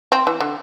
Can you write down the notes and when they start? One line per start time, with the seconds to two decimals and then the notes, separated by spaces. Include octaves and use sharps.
0.12 C4
0.27 E3
0.40 D3